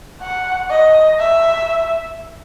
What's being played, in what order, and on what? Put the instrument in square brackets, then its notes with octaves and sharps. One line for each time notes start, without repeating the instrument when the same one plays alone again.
[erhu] F#5
D#5
E5